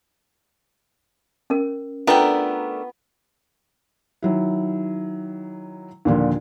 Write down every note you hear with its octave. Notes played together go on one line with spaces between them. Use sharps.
C#4 A#4
A3 B3 D4 F4 A#4 G5 A#5
D#3 F#3 E4
D#2 A#2 D3 F3